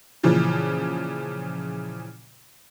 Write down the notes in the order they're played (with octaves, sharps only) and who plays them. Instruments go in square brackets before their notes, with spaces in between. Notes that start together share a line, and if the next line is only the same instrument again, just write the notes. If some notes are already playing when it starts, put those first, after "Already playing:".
[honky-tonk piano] A#2 C#3 E3 F3